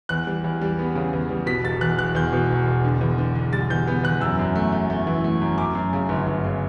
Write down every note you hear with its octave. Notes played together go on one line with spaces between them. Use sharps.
E2 F#6
G3
E2
G3
B3
C#3
E2
G3
B2 B6
E1 A6
E2 F#6
E1 F#6
E2 G6
B2
E1
E1
D3
E2
D3
D3
G3 A6
E2 G6
B3
E2 F#6
F#2 E6
F#2
A3
A3
A3
E3
A3
F#2
F#2 D6
F#2
C#3
G1
G1
C#3